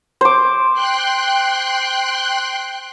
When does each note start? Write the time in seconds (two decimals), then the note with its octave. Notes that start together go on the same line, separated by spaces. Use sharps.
0.21 C5 D6
0.74 G5 C6 F#6